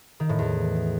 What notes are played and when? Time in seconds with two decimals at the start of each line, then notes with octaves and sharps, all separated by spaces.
0.20 D#3
0.29 A2
0.39 E2